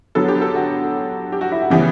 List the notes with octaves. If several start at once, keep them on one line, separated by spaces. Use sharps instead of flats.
D3 F#3 B3 A4
G4
A4
F#4
G4
F#4
E4
F#4
C#3 E3 G3 B3 G4